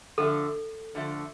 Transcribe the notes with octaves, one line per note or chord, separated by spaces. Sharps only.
D3 F3 A3 A4
D3 F3 A3